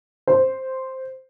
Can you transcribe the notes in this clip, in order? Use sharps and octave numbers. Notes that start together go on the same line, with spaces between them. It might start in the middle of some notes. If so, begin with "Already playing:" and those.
C5